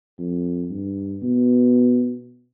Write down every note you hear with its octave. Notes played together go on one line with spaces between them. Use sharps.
F2
G2
B2